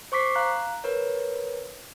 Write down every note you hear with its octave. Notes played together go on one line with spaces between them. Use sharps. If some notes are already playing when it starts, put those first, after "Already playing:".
C5 C#6 D6 B6 C7
F5 A#5 F#6
A#4 B4 C#5